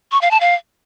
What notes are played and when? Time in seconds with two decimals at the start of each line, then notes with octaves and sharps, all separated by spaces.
0.12 C#6
0.21 F5
0.31 A5
0.40 F5